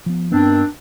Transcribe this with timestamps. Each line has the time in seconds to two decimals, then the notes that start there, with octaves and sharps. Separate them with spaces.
0.06 F3 B3
0.32 G2 D#3 B3 C4 D4